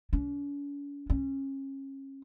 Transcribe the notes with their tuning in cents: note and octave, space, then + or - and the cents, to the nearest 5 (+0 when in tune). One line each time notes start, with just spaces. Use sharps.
C#4 +45
C#4 -30